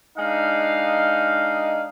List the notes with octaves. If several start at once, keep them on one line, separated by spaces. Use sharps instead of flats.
G#3 D4 D#4 F5